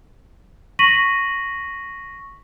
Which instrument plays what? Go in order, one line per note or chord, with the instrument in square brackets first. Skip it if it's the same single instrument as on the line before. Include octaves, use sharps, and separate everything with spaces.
[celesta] C#6 A#6 B6 D#7 F#7